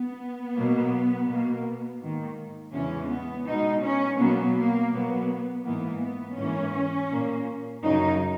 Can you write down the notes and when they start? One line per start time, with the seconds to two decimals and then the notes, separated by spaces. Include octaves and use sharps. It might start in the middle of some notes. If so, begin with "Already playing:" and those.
Already playing: B3
0.56 B2 F#3 A#3
1.28 B2 A#3
2.01 G#2 D#3 A#3
2.73 E2 C#3 E3 G#3 C#4
3.10 B3
3.47 B2 G#3 D#4
3.83 C#4
4.19 B2 F#3 A#3 B3
4.56 A#3
4.92 B2 F#3 A#3 B3
5.65 G#2 E3 A#3 B3
6.02 B3
6.37 G#2 E3 A#3 C#4
7.10 A#2 A#3
7.83 F#2 C#3 F#3 D#4